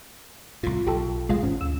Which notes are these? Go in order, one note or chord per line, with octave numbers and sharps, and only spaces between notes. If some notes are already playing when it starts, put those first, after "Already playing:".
C2 A2 F4
B1 G4 A4
B1 F#3 G#3 F4
G#1 C#4
D2 E6